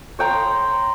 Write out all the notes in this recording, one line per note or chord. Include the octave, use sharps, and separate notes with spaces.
C#5 G5 A#5 C6